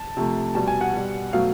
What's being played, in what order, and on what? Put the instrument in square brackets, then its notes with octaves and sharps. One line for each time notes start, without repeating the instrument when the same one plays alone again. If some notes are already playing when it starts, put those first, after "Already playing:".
Already playing: [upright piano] A5
C3 F3 A3
B2 G3 A5
G#5
F#5
B2 G3
B2 F#3 A3 F5